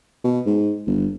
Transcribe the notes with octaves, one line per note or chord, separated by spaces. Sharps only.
B2
G#2
G1